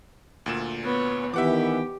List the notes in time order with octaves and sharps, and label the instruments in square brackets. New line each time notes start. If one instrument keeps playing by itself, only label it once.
[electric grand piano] D2 A#2 E7
[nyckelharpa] B3 C#5
[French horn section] D#3 E3 B3 [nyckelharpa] G4 [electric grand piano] E5 F#5 D6